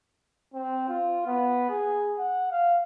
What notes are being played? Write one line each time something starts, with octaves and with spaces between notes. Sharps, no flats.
C4
F4
B3
G#4
F#5
F5